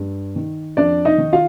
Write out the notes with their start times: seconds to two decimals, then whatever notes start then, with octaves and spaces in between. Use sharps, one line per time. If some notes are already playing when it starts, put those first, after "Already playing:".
Already playing: G2
0.36 D#3
0.77 F2 D4 D5
1.05 D#4 D#5
1.18 D#3
1.33 F4 F5